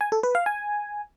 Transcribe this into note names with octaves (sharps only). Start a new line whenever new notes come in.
G#5
A4
B4
F5
G#5